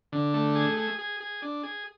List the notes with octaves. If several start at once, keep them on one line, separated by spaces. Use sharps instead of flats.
D3
A3
G#4
G#4
G#4
G#4
D4
G#4